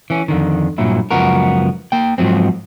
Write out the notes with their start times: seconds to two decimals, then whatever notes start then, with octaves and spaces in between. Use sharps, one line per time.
0.10 E3 C#4
0.28 F2 D3 D#3
0.78 G2 A#2 F#3 E4
1.11 C#2 F#2 F3 B3 F#4 A#4
1.92 A#3 G5
2.18 G#2 F3 F#3 C4